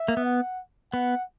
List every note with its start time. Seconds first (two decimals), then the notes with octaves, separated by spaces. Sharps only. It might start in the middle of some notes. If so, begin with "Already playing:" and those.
Already playing: E5
0.08 A#3
0.17 B3
0.25 F#5
0.93 B3 F#5